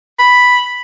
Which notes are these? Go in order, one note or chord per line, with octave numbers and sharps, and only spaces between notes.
B5